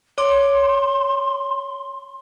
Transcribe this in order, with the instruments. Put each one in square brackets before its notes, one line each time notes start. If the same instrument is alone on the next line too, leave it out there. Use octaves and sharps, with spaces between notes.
[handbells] C#5 D6 D7 [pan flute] C6